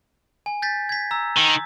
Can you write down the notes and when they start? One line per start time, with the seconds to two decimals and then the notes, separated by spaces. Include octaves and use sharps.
0.46 G#5
0.62 G6 A6 B6
0.89 G#6 B6
1.11 A#5 E6
1.37 D#3